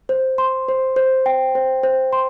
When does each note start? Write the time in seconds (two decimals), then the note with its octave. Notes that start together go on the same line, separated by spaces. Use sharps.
0.09 C5
0.38 C6
0.68 C5
0.96 C5
1.26 G5
1.55 C5
1.83 C5
2.13 C6